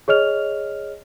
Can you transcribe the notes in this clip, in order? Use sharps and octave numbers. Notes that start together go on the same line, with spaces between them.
G#4 C#5 D#5 F6 F7